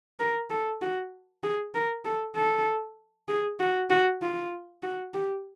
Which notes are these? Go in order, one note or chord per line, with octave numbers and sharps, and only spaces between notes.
A#4
A4
F#4
G#4
A#4
A4
A4
G#4
F#4
F#4
F4
F#4
G4